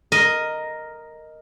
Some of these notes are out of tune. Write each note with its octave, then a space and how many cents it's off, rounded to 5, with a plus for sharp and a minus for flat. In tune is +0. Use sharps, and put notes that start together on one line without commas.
A#4 +0 D#5 +0